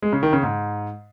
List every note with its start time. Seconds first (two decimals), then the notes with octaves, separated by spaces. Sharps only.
0.02 G#3
0.13 C#3
0.23 D#3
0.33 C#3
0.43 G#2